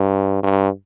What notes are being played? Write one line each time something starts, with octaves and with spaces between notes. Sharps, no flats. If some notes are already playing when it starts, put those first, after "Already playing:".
Already playing: G2
G2